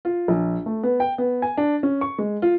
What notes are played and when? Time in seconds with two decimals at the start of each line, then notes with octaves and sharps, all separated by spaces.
0.05 F4
0.28 A#1
0.66 A3
0.83 B3
1.00 G5
1.18 B3
1.42 G#5
1.57 D4
1.83 C#4
2.01 C#6
2.18 G#3
2.42 F4